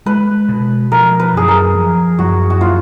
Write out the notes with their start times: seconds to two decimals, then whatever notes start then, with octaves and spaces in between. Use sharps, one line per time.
0.06 G#3 B4
0.48 B2
0.92 F3 A#4
1.20 B4
1.34 F#2 G#4
1.48 A#4
1.75 F3
2.19 F#2 F#4
2.50 F#4
2.61 A#3 F4